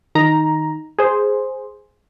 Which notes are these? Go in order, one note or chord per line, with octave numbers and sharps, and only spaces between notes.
D#3 D#4 A#5
G#4 C5